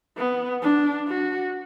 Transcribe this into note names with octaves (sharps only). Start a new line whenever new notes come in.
B3
D4
F#4